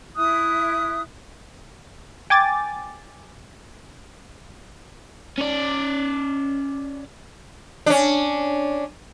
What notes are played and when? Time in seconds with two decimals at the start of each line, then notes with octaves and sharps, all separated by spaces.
0.16 E4 E5 D#6 F#6
2.30 G5 G#5 D6 A6
5.38 C#4 D5
7.86 C#4 D4